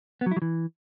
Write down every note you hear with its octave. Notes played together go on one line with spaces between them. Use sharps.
B3
F#3
E4
F#3
E3